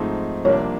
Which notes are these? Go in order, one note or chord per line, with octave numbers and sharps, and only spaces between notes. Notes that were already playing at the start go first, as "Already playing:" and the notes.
Already playing: G#2 F3 A3 C4 D#4
C2 C3 F3 A#3 D4 C#5